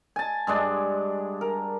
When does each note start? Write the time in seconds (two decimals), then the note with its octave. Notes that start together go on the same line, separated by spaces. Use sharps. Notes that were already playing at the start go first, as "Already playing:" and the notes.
0.16 G#5 A5
0.47 G2 G#3 D4
1.41 A#4